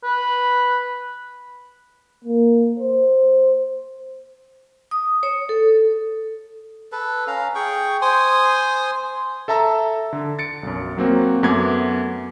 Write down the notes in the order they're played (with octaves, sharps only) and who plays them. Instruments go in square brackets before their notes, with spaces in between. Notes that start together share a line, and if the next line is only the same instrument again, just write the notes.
[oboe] B4
[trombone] A#3
C5
[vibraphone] D#6
C#5
A4
[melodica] A4 B4
C#4 F5 A#5
G#4 G5 C#6
C5 G#5 C6 D#6
[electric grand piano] A4 E5 A5 A#5 E6
D3
A6 C#7 D7
B1 F#2
F#3 A#3 C4 F#4
F#2 A3 B3 F#5 D6 G#6